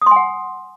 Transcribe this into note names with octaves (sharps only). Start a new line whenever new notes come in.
F#5 G#5 C6 D#6